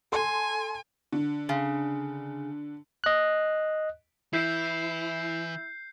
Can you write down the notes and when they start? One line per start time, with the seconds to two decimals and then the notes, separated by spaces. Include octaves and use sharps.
0.12 A4 G#5 C6
1.12 D3
1.49 C#3
3.04 D#5 F#6
4.33 E3 E4 G6 C7